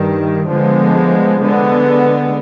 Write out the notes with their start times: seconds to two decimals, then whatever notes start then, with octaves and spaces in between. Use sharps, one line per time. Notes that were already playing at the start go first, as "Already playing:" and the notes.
Already playing: G2 D#3 G3
0.49 D3 F3 G#3 B3
1.41 D3 G#3 B3